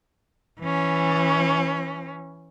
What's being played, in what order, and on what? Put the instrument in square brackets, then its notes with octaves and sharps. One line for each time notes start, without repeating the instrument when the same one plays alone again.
[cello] E3 C#4